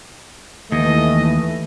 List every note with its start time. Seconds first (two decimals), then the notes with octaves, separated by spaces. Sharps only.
0.72 D#2 E3 A3 D#5